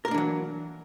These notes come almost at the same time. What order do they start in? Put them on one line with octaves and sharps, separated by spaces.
A#4 A#3 D4 E3 F#3